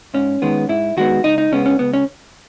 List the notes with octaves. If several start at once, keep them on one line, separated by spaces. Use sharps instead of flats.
G#2 C#4
D#3 G#3 B3
G#2 E4
D#3 G#3 B3 F#4
C#2 D#4
D#4
C#3 G#3 B3 C#4
C#4
C#2 B3
C#4